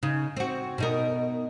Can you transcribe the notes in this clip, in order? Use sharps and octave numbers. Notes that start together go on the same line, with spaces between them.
C#3 D#4
C4 F#4
B2 D#4 A#4